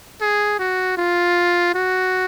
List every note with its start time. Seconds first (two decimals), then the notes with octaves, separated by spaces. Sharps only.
0.21 G#4
0.59 F#4
0.97 F4
1.74 F#4